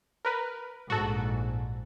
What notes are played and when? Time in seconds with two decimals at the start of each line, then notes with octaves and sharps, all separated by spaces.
0.25 A#4 B4
0.90 A#1 G#2 F#4 A4